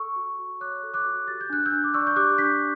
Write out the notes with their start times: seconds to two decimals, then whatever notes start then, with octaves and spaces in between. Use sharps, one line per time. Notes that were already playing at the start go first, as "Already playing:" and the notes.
Already playing: A4 C#6 E6
0.16 F#4
0.39 F#4
0.60 C#5 D6 F#6
0.83 A4
0.94 D6 F#6
1.05 F#4
1.27 G4 A6
1.41 G6
1.50 D4 F#6
1.66 E6 G6
1.72 D4
1.84 D6
1.94 D5 C#6 E6
2.07 G6
2.16 G4 D6 F#6
2.38 D4 G6 B6